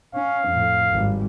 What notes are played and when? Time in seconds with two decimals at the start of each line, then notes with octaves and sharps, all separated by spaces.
0.15 C#4 F5
0.49 F2 A2
0.92 G#1 G3